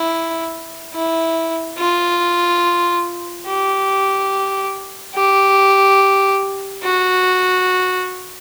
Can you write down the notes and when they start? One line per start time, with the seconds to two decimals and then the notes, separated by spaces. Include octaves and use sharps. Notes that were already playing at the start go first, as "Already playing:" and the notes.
Already playing: E4
0.94 E4
1.78 F4
3.47 G4
5.15 G4
6.83 F#4